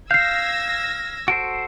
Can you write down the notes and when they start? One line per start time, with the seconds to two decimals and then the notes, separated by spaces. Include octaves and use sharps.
0.11 F5 E6 G6 G#6 A#6 C7
1.28 F#4 A4 C5 D7